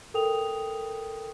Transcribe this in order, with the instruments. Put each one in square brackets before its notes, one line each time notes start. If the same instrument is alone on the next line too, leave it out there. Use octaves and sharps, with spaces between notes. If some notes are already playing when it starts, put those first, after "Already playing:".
[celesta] A4 A#4 G5 D#6 F7